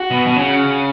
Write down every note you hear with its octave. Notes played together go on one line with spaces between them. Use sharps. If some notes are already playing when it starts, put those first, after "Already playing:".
Already playing: F#4
B2
B2
C#3